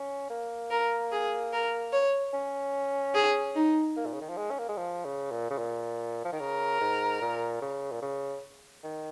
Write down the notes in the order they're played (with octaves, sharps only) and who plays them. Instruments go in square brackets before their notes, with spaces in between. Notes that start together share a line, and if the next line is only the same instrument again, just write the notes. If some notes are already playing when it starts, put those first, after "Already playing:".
Already playing: [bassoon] C#4
A#3
[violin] A#4
G#4
A#4
C#5
[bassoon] C#4
[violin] G#4
D#4
[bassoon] A#3
A#2
C#3
D#3
F3
G#3
C#4
A#3
G#3
F3
C#3
A#2
C#3
A#2
F3
D#3
[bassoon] C#3 [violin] A#4
[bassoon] G#2
A#2
C#3
A#2
C#3
D#3